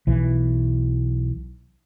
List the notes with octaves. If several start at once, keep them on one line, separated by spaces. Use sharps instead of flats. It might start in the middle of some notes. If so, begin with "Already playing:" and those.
B1 E3